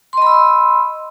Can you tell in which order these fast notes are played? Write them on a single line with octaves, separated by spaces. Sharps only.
C6 D#5 B5 E6